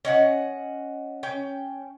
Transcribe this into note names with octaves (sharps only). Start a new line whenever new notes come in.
C#4 D#5 F#5
C#4 G5